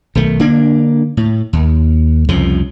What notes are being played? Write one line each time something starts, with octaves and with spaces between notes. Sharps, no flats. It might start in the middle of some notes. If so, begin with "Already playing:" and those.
B1 D#3 A3
D3 A#3 D4
A2
D#2
C2 F2 C#3 F3